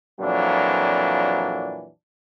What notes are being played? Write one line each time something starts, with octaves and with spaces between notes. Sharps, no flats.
F2 A#2 E3 F#3 D4